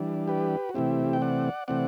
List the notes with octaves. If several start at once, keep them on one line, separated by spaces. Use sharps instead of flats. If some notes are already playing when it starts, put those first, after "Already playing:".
Already playing: E3 G3 D4
G4 B4
F#4
C3 E3 A3 C4 E4 G4
G5
D5 F#5
C3 E3 A3 C4 D5 F#5